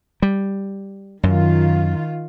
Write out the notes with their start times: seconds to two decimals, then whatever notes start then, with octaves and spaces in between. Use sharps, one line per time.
0.22 G3
1.23 F#2 D#3 F4